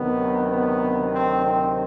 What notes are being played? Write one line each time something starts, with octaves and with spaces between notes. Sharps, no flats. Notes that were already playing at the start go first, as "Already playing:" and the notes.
Already playing: D2 C3 D#3 F#3 B3
B3
C4
C4